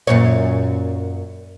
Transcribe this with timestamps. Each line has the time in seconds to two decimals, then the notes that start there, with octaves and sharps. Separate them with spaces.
0.07 F#2 A#2 C#5